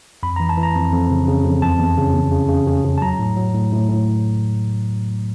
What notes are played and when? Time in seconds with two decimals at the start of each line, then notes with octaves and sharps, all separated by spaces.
0.23 F2 B5
0.36 E3 A#5
0.49 A5
0.58 E3
0.63 A#5
0.75 F2
0.93 F2
1.10 C#3
1.28 C#3
1.45 F2
1.62 E2 A5
1.80 E2
1.97 C#3
2.14 E2
2.32 C#3
2.49 C#3
2.67 C#3
2.84 C#3
2.98 A5
3.02 F#3 A#5
3.19 A2
3.36 F#3
3.54 A2
3.72 A2
3.89 A2